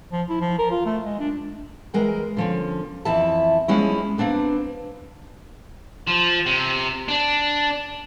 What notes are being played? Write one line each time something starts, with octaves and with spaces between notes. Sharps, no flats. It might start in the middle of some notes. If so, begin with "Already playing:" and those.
F3
E4
F3
A#4
F4
A3
G#3
D4
E3 G#3 A#4 G5
D3 F3 C#4
F2 E3 E4 E5 A5
F3 G#3 C#4 E4
A#3 C4 D4 B4
F3
C3
D4